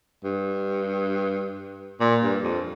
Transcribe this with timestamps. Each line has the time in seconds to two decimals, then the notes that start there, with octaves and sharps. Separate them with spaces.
0.24 G2
2.00 A#2
2.23 G2
2.44 F2